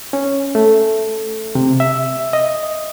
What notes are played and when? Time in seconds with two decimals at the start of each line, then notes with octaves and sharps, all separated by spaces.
0.13 C#4
0.55 A3
1.55 C3
1.80 E5
2.33 D#5